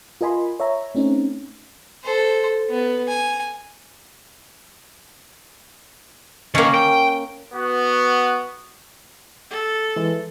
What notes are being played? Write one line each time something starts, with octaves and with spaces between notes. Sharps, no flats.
F4 A#4 D#5 G#5 B5 C6
C#5 E5 A#5
A3 C4 C#4 D#4
A4 C5
B3
G#5
D#3 A#3 C#4
G5
B3 F#4
A4
E3 G#3